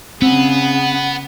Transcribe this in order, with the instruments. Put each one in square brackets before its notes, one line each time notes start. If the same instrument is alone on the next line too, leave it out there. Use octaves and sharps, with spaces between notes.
[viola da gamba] C#3 G#4 [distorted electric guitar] B3 [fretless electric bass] C4 [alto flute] F#5